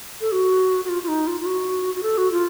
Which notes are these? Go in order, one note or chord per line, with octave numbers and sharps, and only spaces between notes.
A4
F#4
F#4
F4
F4
D#4
F4
F4
F#4
F#4
A4
F#4
F4